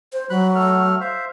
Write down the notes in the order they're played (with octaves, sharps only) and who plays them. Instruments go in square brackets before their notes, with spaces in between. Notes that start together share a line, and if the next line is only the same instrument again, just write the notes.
[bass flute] C5
[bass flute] F#3 [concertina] B5 F#6
[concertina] A3 A4 F6
C5 E5 F5